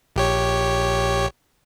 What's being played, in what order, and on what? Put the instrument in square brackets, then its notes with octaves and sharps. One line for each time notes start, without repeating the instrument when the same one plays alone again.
[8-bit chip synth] A#1 G4 C#5